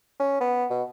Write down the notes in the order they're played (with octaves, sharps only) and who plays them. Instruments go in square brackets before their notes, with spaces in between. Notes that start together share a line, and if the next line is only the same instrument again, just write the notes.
[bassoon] C#4
B3
B2